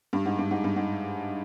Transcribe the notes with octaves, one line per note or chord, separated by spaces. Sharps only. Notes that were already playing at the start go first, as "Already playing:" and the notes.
G2
G#2
G2
G#2
G2
G#2